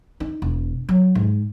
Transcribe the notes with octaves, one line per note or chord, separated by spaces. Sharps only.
D#4
E1
F#3
G#2